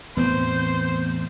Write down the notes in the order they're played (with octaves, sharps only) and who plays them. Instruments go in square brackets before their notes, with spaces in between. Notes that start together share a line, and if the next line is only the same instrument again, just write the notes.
[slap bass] E2 A2 C4 [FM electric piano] B3 [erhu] C5